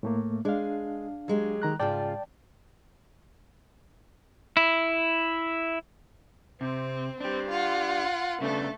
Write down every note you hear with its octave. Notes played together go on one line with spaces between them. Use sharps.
A2 A3 A#3
G#3 D4 F5
F#3 G#3 G4
D#3 A#5 F#6
G#2 C#3 F4 D5 G5 A5
E4
C3 C4
C4 D4 G4
F4 F#5
C#3 A3 B3 D4 A4